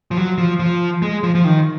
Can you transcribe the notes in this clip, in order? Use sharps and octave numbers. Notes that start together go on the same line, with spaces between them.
F3
F#3
F3
F3
G#3
F3
F3
D#3